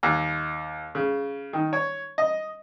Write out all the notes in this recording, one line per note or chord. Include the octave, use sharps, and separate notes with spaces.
D#2
C#3
D#3
C#5
D#5